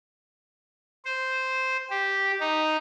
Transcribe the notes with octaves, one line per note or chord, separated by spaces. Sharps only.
C5
G4
D#4